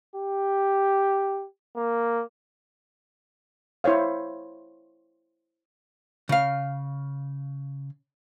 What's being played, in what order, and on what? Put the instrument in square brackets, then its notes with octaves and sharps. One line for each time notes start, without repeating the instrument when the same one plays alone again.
[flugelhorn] G4
A#3
[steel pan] E4 C5 C#5 F5
[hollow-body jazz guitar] C#3 F5